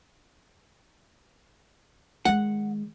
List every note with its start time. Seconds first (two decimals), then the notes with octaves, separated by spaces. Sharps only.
2.25 D#3 G#3 F#5